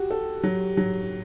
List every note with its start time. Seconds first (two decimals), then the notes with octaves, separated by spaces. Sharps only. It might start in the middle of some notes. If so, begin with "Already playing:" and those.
Already playing: F#4 G4
0.11 A4
0.43 F#3
0.77 F#3